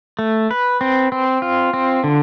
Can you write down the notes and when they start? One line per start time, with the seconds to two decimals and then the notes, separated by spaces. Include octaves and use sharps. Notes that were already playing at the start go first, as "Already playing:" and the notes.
0.19 A3
0.51 B4
0.81 C4
1.12 C4
1.42 F4
1.73 C4
2.04 D3